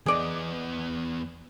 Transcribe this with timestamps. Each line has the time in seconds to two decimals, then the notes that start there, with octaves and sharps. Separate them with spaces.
0.06 E2 B3 G#4 D5 D#5